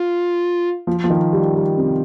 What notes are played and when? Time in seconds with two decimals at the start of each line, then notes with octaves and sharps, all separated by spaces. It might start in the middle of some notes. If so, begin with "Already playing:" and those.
Already playing: F4
0.87 F3
1.04 F3
1.10 D#3
1.33 G3
1.55 G3
1.77 C3